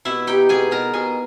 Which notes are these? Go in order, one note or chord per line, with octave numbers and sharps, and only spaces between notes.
B2 E4 E5
D#4 G4 G5
B2 G#4 G#5
B2 A#4 A#5
B2 G#4 G#5